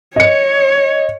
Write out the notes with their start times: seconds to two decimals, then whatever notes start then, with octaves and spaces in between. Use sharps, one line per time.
0.16 C#5 D#5 C#7